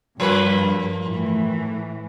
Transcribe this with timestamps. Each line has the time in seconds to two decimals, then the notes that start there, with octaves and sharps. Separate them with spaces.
0.20 G2 F3 A#3 B4
1.02 A2 E3